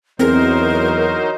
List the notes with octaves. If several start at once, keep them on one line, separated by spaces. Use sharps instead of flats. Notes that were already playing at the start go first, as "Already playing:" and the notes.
E2 F#3 C4 D#4 G#4 A#4 C5